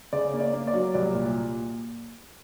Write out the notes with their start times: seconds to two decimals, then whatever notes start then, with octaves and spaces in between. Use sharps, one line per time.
0.13 C#3 D5
0.33 A#3
0.40 D5
0.53 A#3
0.67 D5
0.74 F#3
0.94 C2 D5
1.15 A#2